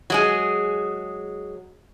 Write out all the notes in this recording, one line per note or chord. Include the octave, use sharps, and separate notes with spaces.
F#3 G#3 G#4